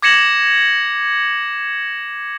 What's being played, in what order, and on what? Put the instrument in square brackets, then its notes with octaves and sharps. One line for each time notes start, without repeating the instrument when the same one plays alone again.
[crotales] D6 G#6 A#6 C#7 E7 F#7